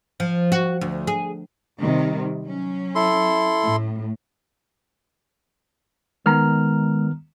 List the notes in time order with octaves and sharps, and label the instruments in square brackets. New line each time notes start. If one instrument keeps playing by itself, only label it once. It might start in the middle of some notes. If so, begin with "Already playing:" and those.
[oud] F3
F#4
D2
G#4
[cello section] C3 D#3 G3
F#3 C#4
[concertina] E4 A4 C6
[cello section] A2
[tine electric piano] D#3 B3 F6 [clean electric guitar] G#3 A#5